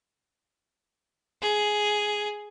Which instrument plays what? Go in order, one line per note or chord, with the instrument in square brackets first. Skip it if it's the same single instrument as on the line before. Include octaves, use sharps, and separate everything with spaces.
[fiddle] G#4